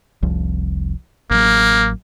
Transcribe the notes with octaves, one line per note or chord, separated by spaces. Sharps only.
F1 C2 F3
A1 F#3 A#3